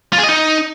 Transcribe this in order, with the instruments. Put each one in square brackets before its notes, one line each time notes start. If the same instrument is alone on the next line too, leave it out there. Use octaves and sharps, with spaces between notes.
[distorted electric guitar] F4
G#4
D#5
D#4